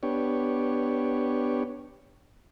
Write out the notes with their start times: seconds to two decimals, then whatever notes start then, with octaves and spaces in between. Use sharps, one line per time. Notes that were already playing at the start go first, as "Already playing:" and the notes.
0.03 B3 D4 G4 C#5